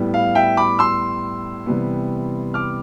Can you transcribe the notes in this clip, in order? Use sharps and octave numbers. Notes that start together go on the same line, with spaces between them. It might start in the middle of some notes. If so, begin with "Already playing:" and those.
Already playing: A2 G3 B3
F5
E5 G5
B5 D6
C6 E6
C3 E3 G3 B3
D6 F6